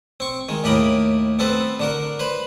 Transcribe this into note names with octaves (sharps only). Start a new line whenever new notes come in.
C4 C#6
D#3 G#3
D#2 A2 G4 A#4 D#5 B5
B3 C4 A4 B4 C5
D3 F#4 A#4
B4 C5 B5